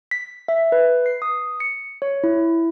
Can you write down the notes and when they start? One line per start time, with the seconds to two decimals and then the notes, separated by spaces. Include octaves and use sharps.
0.11 B6
0.48 E5
0.72 B4
1.06 C7
1.22 D#6
1.60 C#7
2.02 C#5
2.24 E4